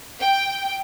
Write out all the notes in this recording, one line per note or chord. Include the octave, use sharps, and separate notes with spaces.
G5